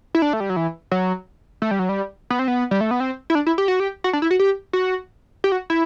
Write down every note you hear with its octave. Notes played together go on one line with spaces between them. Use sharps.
E4
D4
A3
G3
F#3
E3
F#3
A3
G3
F#3
G3
B3
C4
B3
G3
A3
B3
C4
E4
D4
E4
G4
F#4
G4
F#4
D4
E4
F#4
G4
F#4
G4
F#4
E4